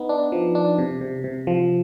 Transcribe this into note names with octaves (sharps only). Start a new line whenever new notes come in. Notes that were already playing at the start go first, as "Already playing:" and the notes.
Already playing: B3 D#4
D4
F3
D4
C3
C3
C3
F3